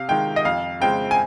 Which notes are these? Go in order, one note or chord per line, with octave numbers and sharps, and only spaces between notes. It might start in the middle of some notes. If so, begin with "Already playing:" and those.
Already playing: C3 F5
D#3 G#3 G5
D#5
F2 F5
C#3 G#3 C4 G5
G#5